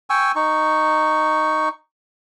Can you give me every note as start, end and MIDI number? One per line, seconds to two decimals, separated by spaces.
0.10 0.32 79
0.10 0.32 80
0.10 0.32 85
0.10 0.32 88
0.36 1.69 63
0.36 1.69 85